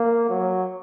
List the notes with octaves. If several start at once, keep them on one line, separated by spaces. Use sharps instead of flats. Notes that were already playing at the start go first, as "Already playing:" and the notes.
Already playing: A#3
F#3